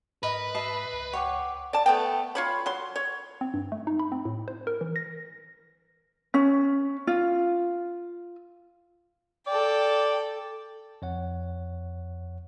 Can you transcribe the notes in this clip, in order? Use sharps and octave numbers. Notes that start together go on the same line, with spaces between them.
G#2 A#4 B4 D#5
D#5 E5 A5 C7
C#2
C#5 F#5 G5 D6
D5 A5
A3 B3 G5
F4 C#5 B5
F#3 C6
C#5
C4
G2
A3
D#4
B5
C4
A2
C5
A#4
E3
A#6
C#4
F4
A4 D5 G5
F2 C#5 F#5